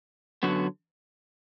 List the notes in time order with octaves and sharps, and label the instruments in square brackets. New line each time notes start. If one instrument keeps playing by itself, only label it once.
[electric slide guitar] F#2 D3 F#3 B3 F#4